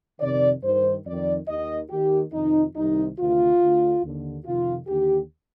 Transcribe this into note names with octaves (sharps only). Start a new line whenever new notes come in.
F2 C3 D#3 D5
G2 D#3 C5
F2 D#3 D5
D#2 D#3 D#5
D#2 D#3 G4
F2 C3 D#3 D#4
C2 C3 D#3 D#4
D2 C3 D#3 F4
D2 D3
D#2 D3
F2 C3 D#3 F4
D#2 D3 G4